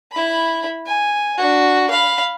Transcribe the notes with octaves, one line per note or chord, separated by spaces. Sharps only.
E4 B5
G#5
D4 F#4
F5 B5